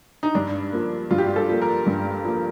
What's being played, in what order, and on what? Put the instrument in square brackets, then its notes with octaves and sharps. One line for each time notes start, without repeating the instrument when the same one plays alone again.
[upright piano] D#4
[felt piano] G2 [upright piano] D4
[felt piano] F3 A#3
[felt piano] G2 [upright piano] F4
[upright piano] G4
F4
A4
[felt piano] F3 A#3
[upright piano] A#4
[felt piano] G2
F3 A#3